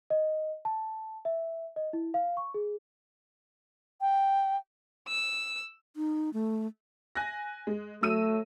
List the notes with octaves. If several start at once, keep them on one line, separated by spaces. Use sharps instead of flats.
D#5
A5
E5
D#5
E4
F5
C#6
G#4
G5
E6
D#4
A3
G#5 F#6 A#6
G#3
F#3 A3 E6 D#7